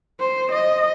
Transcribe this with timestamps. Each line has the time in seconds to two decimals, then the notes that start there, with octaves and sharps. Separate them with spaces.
0.20 C5
0.52 D#5